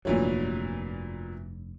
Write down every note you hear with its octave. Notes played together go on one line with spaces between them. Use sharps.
F1 G2 A#2 E3 F#3